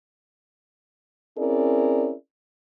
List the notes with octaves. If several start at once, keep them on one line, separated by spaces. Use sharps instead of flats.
C4 C#4 E4 G#4 A#4 D5